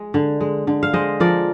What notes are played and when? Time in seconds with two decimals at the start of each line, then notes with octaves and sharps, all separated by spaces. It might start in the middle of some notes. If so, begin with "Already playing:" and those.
Already playing: G#3
0.14 D3
0.41 G#3
0.67 D3
0.83 F5
0.93 G#3 C5 D#5
1.20 F3 A#4 D5